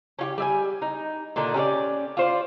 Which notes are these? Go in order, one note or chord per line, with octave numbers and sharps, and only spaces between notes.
C#4 F4 G4
G3 E5 G#5
D#4
A#2 D3 D4 D#4
C#4 G4 A#4 D5
F4 C5 D5